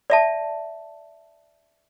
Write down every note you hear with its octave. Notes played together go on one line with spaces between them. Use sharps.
D5 E5 A5